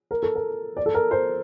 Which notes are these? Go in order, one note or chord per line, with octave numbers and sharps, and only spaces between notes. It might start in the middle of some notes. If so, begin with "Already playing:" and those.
A#4
A4
A#4
D5
A4
A#4
C5